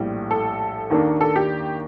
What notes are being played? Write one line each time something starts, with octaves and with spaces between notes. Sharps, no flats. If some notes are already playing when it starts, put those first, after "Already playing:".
Already playing: A#1 A2 G3
A4
D#2 D#3 A#3 D4
A4
G4